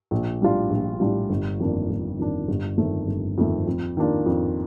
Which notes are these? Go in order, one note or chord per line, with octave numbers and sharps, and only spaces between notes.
A#1
A2 G3 D4 F4
A#1
A2 G3 D4 F4
G1
F2 D#3 A#3 D4
G1
F2 D#3 A#3 D4
G1
F2 D#3 A3 C4
G1
F2 D#3 A3 C4
F2
D#3 A#3 D4 F4
F2